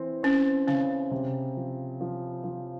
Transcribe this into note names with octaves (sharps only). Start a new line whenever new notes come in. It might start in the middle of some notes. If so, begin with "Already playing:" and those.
Already playing: E3 C4
C4 C#4
C#3 C#4
C3
F3
F3
F3